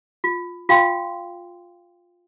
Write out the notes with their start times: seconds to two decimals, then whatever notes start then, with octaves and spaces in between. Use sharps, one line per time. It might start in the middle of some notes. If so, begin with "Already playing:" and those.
0.24 F4
0.69 F4 F5 G5 C6